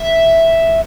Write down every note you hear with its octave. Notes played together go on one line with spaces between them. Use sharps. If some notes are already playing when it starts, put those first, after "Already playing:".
Already playing: E5